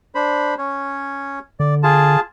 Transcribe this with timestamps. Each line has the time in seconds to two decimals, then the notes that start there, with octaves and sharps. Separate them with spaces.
0.15 D4 C5 B5
0.58 C#4 C#5
1.60 D3 D5
1.83 F4 G#4 A5